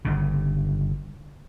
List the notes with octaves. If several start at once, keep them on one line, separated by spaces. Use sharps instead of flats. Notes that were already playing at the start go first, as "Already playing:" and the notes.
G1 G2 C#3